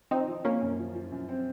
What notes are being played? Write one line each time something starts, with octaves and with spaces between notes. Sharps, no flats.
F3 C4 D#4
F3
F3 A#3 C#4
F#2
F3
F3
F#2
C4